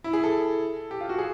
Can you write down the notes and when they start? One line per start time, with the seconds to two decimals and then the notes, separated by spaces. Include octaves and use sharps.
0.04 E4
0.13 G#4
0.24 A4
0.91 G4
1.01 F4
1.09 F#4
1.18 G#4